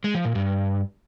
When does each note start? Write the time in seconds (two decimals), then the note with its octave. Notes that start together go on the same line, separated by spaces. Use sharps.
0.04 G#3
0.14 F3
0.25 A#2
0.35 G2